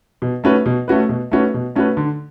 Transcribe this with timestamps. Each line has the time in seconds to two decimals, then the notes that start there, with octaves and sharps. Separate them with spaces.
0.22 B2
0.44 A3 C#4 F#4 B4
0.66 B2
0.88 A3 C#4 F#4 B4
1.09 B2
1.31 A3 C#4 F#4 B4
1.54 B2
1.76 A3 C#4 F#4 B4
1.97 D3